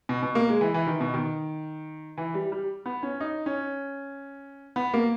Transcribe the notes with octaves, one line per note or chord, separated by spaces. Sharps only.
B2
B2
A#3
G#3
E3
E3
D#3
B2
D#3
E3
G3
G3
B3
C#4
D#4
C#4
B3
A#3